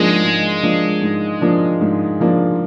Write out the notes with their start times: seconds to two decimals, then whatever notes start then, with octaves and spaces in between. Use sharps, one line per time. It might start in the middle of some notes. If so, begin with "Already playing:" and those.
Already playing: G#2 F3 G#3 A#3 D4
0.23 G#2
0.62 F3 A#3 D4
1.01 G#2
1.41 F3 A#3 D4
1.81 G#2
2.20 F3 A#3 D4